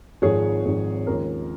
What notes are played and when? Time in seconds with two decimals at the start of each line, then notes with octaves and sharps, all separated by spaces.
0.22 G#1 G#2 F3 G#4 C#5
0.65 G#1 G#2 F3
1.07 D#2 C#3 F3 G#3 A#4